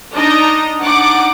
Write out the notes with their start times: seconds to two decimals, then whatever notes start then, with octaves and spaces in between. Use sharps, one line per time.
0.15 D4 D#4 D#5 A#5
0.82 D4 D#4 F#5 D6